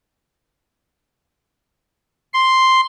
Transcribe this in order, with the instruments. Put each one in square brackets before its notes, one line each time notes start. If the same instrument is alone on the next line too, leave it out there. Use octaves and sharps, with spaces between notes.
[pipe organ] C6